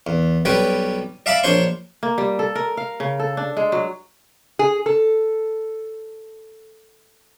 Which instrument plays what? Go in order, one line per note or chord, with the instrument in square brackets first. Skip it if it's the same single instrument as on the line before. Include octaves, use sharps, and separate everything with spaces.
[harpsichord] E2
B1 G3 C#4 G4 B4 D5
D5 E5 F5 A5 B5 D6
A#1 D4 C5 C#5 C6 C#6
[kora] A#3
G3
A4
A#4
F5
C#3
A4
D4
G#3
F#3
[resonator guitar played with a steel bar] G#4
A4